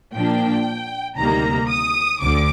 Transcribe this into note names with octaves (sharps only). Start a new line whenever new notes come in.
A#2 F3 A#3 D4 G5
D2 C3 D#3 G3 A#3 A#5
D#6
D2 D3 D6